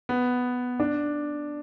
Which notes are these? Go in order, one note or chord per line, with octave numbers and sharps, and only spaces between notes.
B3
D4